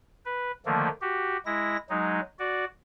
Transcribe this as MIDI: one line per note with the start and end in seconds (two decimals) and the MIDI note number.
0.25 0.51 71
0.66 0.89 50
0.66 0.89 51
0.66 0.89 53
0.66 0.89 57
0.66 0.89 58
1.01 1.37 66
1.01 1.37 67
1.46 1.77 56
1.46 1.77 64
1.46 1.77 94
1.90 2.20 54
1.90 2.20 56
1.90 2.20 63
2.39 2.65 66
2.39 2.65 74